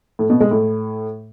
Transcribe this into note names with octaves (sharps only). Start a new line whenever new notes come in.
A2
B2
G#3
A2